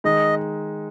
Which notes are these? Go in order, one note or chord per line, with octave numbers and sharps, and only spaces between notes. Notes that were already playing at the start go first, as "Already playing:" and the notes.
D#3 G#3 D#4 D#5